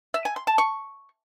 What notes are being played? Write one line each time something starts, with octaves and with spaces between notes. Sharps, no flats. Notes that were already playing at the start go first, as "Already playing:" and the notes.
E5
G#5
C6
A5
C#6